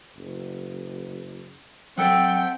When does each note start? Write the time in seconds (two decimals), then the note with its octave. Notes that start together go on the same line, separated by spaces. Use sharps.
0.17 F#1
1.98 F#3 C4 A4 E5 F#5 G5